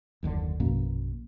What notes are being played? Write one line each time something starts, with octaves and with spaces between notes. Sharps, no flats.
F#1 D#2 A#2 D3
A#1 F#2 B2 A#3